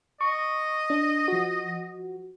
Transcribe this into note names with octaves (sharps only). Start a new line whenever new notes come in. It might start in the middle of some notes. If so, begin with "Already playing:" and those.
D#5 C#6
D4
F3 F#4